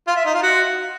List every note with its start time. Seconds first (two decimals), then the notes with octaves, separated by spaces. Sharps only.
0.08 F4
0.16 E5
0.25 D#4
0.34 F4
0.43 F#4